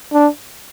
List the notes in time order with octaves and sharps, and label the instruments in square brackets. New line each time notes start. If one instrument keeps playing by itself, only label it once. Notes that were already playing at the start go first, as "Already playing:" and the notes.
[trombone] D4